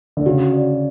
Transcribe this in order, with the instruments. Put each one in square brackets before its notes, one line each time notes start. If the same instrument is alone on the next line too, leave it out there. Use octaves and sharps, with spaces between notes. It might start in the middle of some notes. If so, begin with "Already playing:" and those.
[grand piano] D3
[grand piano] C#3 [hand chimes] F#4
[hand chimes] D5